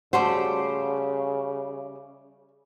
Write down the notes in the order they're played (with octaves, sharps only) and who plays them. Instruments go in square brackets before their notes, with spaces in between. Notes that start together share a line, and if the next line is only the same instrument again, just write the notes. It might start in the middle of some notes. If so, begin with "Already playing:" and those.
[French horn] C#3 [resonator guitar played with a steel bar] G3 A3 C5 [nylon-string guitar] F#4